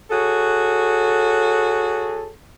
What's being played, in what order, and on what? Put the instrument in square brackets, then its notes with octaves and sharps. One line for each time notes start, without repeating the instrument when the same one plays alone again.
[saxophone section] F#4 G#4 A4 C#5